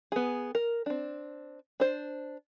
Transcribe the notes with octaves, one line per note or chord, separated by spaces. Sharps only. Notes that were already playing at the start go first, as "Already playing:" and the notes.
B3 G#4
A#4
C4 D4
D4 C5